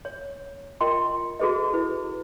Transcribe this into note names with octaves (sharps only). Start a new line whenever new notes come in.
C#5
F4 A#4 D#5 G5 C6
F#4 G#4 A4 B4 D#5
E4 B4